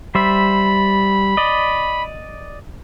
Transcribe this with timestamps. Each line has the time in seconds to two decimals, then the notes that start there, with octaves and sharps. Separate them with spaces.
0.15 G3 C5 E5 B5
1.37 D5 D#5